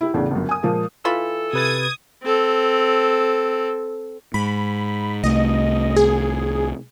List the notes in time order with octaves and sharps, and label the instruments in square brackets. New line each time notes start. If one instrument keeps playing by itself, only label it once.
[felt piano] E4 G4
E2 A2 C#3 D4
G1 F#2
G#5 D#6
A#2 F3 G#3 A#3
[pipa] E3 F4 B5 [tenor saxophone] A4
[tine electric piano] C3 B4 A6 [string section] D#6 G#6
[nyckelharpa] C4 A4
[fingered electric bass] G#2 [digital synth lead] B5
[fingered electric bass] C2 A3 [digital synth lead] D#5
[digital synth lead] G#4